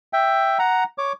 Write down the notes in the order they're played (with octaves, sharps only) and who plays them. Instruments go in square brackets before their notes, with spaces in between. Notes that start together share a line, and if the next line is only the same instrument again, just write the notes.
[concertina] E5 G5
F#5 A#5
C#5 D6